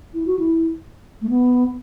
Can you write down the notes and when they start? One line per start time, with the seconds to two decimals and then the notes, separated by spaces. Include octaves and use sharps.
0.14 E4
0.26 F#4
0.39 E4
1.21 A3
1.29 B3